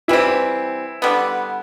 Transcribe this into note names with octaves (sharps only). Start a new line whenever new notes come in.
E3 G3 C4 E4
D3 G3 B3